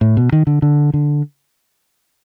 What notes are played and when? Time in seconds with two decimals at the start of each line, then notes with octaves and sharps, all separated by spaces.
0.01 A2
0.17 B2
0.32 D#3
0.47 D3
0.62 D3
0.94 D3